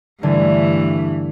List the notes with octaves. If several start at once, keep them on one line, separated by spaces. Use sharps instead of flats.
G2 D3 E3 G3 A3 G#5